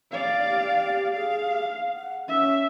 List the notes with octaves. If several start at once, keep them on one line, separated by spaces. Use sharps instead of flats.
D5 F5
G4
G#4 F5
F#5
C#4 E5